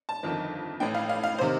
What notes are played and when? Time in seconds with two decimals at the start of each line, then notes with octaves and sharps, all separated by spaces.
0.09 A5
0.23 G1 F2 D#3
0.80 A1 A2 G5
0.95 F5
1.09 F5
1.24 F5
1.38 C5
1.41 C3 D#3